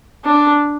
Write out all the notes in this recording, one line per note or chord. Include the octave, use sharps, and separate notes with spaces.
D4